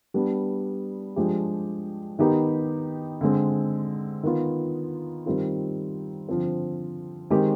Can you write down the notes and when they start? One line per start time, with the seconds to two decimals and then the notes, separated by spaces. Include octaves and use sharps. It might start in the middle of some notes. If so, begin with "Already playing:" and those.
0.14 G3 B3 D4
1.16 F3 G#3 D4 G4
2.19 D#3 B3 D#4 G4
3.21 D3 G#3 C4
4.23 D#3 B3 F4
5.26 D#3 G3 C4 F4
6.29 D3 F3 C4
7.30 D#3 G#3 C4 G4